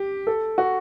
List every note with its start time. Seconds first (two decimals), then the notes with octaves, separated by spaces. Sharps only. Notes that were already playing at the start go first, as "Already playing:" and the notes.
Already playing: G4
0.27 A4
0.58 F#4